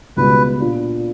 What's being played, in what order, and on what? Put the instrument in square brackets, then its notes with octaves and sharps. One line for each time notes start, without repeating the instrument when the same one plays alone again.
[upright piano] C#2 B2 G3 B3 [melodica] B4
[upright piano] A#2 A#3 D4